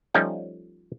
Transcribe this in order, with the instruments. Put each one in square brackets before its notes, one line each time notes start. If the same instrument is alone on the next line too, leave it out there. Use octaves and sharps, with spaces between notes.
[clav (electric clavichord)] F3 G3 A3 C#4 D#4 F4